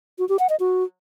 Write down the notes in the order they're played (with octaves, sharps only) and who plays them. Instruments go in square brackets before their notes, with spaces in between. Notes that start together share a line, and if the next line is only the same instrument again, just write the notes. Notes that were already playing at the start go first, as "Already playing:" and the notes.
[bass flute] F#4
G4
F#5
D#5
F#4